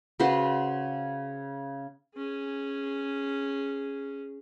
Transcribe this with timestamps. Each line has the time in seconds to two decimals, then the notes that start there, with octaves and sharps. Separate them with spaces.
0.20 C#3 F#4 B4 C5
2.16 C#4 G#4